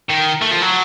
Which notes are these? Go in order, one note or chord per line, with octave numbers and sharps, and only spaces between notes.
D#3
A3
F3
F#3